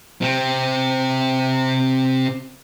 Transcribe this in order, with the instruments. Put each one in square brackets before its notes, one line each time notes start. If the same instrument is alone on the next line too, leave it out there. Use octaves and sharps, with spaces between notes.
[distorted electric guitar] C3 C4